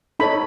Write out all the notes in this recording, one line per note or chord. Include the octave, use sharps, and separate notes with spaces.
D#4 A4 C#5 B5